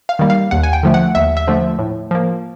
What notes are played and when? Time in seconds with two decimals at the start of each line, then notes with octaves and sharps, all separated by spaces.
0.09 F5
0.19 D#3 G3 A#3
0.30 F5
0.51 D#2 F#5
0.63 G#5
0.73 G5
0.83 D3 F3 A3
0.94 F#5
1.15 D#2 E5
1.37 E5
1.47 D3 F3 A3
1.79 A2
2.11 F3 A#3